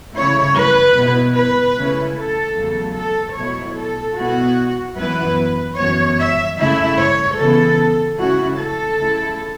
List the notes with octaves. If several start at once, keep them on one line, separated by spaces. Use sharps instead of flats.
C#3 A3 E4 C#5
B4
B2 B3 E4
B4
C#3 A3 C#4 E4
A4
E2 C#3 F#3 A3
A4
B2 F#3 A3 E4 C#5
A4
B2 B3 E4 F#4
F#2 E3 B3 E4 B4
F#2 E3 B3 C#5
E5
C#3 A3 C#4 E4 E5
C#5
C#3 E3 B3 E4 A4
C#3 A3 C#4 E4 F#4
A4
C#3 A3 E4